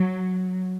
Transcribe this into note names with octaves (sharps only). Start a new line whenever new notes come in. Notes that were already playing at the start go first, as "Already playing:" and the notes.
Already playing: F#3